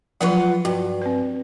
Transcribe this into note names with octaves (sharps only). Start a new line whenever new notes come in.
F3 F#3 F4 B4 F#5
G2 F#4
C4 B4